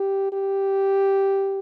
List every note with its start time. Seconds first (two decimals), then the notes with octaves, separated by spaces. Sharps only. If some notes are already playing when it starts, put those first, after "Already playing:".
Already playing: G4
0.32 G4